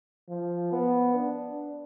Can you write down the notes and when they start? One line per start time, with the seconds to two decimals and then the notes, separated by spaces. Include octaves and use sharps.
0.29 F3
0.72 B3
1.14 D4